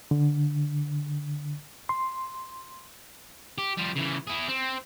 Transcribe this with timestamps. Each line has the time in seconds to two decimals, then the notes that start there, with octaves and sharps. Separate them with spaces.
0.11 D3
1.89 C6
3.58 G4
3.77 F3 G3
3.95 C#3 E3
4.27 E4 G#4
4.48 C4